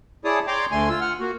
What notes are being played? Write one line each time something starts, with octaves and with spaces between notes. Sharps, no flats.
E4 G#4 C#5 D5 A5 D#6
C#5 D5 G5 A#5 C6 D6
D2 D3 A3 G#5 C6
F4 E6
F#5 F6
A#3 F#4